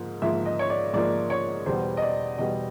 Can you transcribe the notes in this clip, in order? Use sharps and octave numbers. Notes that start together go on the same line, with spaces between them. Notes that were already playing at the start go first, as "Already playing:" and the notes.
Already playing: G#2 F3 A#3
G#2 F3 A#3 E5
D#5
C#5
D5
G#2 F3 A#3 D5
C#5
E2 B2 G3 B3 C5
D#5
D5
E2 B2 G3 B3 D#5